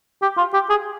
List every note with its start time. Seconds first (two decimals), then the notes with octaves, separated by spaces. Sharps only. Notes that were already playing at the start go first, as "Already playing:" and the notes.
0.22 G4
0.37 F4
0.54 G4
0.69 G#4